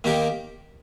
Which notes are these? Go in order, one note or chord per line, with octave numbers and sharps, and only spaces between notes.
D#3 A#3 D#4 G4 A#4